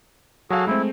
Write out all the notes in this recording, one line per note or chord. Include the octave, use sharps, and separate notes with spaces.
F#3 F#4 G#4 A4 F5
G#3 A3 C4 E4